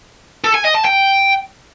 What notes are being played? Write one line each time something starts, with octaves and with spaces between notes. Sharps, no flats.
A4
G#5
D#5
A5
G5